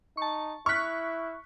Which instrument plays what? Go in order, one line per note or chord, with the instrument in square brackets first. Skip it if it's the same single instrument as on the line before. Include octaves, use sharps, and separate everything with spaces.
[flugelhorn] D#4 [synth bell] A5 C#6
[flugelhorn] E4 [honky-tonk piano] C#6 F#6 [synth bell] F6 B6